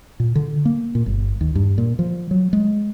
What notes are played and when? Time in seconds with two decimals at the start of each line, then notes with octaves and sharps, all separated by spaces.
0.20 A#2
0.35 D3
0.65 A#3
0.95 A#2
1.06 G1
1.41 D#2
1.55 G2
1.78 A#2
1.99 F3
2.31 F#3
2.53 G#3